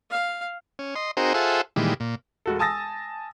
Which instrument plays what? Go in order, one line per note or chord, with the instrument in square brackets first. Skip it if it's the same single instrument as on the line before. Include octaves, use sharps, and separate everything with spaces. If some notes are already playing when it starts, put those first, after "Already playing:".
[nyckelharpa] F5
[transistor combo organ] C#4
D#5 C6
C4 D#4 F#4 G#4 A#4 C5
F4 G#4 A4 C5 E5 F#5
A#2 D#3 E3 G3 G#3
A#2
[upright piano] E1 F#4 A4
G#5 A5 D#6 E6 A6 A#6